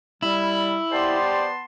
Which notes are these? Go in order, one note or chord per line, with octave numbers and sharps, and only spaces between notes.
G3 E4
B3 G4 C5 D5 A5 C6